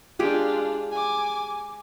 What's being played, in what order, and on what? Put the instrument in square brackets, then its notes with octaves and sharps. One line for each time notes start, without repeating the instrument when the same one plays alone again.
[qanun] G#3 G4 G#4 [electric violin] D4 F4
[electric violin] G#5 D6